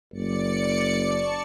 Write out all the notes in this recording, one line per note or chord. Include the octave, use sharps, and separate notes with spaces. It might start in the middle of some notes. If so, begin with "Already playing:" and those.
F#1 D5 C#7
A5 C#6